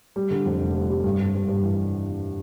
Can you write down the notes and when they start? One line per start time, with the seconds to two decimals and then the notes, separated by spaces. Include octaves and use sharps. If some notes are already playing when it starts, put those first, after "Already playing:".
0.16 G3
0.31 D3
0.46 F2
0.60 F1
0.75 G3
0.90 G3
1.04 G2
1.19 G2
1.34 G2
1.48 G2
1.63 E3